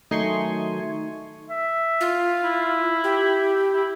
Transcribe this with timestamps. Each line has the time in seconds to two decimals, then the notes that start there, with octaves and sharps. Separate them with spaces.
0.11 D#3 F#3 A3 D#4 G#5 C6 C#6
1.50 E5
2.01 F4
2.44 E4
3.04 G4
3.73 E4